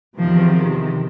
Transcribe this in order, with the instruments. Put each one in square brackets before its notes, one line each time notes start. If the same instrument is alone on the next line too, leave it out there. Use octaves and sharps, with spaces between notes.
[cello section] E2 C3 D#3 F3